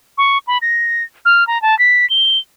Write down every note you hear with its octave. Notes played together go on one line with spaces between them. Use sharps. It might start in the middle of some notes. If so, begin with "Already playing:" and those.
C#6
B5
A#6
F6
A#5
A5
B6
G7